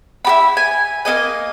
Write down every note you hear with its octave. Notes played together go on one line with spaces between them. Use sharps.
E4 G4 B5
G#5
A#3 C#4 D#5 G#5